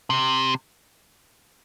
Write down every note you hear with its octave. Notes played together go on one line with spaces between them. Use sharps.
C3